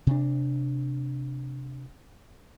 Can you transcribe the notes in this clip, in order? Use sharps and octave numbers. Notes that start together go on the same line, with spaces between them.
C3 D4